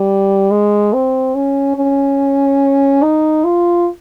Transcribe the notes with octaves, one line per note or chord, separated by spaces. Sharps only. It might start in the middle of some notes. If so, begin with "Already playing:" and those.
Already playing: G3
G#3
C4
C#4
C#4
D#4
F4